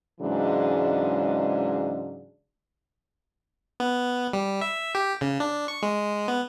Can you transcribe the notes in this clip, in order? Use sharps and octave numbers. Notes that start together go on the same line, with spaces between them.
G#2 C#3 E3 F#3 G#3 D4
B3
G3
E5
G4
C#3
D4
C#6
G#3
B3